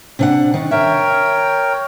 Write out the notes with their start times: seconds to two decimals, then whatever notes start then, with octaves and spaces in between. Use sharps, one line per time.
0.19 C3 D4 F#5
0.54 D#3
0.71 A#4 C#5 E5 G5